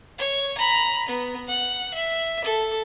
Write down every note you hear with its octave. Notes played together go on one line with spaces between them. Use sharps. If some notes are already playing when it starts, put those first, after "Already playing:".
C#5
A#5 B5
B3
F#5
E5
A4